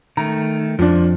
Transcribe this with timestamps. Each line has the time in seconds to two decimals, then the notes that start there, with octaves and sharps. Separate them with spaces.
0.17 D#3 A3 A#5
0.79 F2 F3 D4